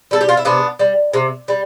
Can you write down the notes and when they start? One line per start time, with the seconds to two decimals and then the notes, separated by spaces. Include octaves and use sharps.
0.11 G3 A4
0.21 G4
0.29 F4
0.37 E4
0.45 C3 B3 D4
0.79 G3
1.13 C3
1.48 G3